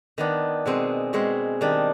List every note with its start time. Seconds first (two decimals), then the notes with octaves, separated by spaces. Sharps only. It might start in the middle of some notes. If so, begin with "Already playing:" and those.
0.18 D#3 B3 D4
0.66 B2 G#3 C4
1.13 B2 G#3 C4
1.61 D#3 G3 D4